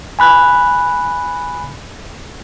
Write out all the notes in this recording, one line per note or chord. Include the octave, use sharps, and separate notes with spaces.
G#5 B5 F#6